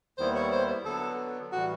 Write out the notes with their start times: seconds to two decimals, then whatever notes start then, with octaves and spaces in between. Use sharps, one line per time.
0.18 D#2 D#3 G3 B3 E4 C5
0.35 C#5
0.52 C5
0.85 D3 F#3 B3 A4
1.52 A2 E3 G3 F#4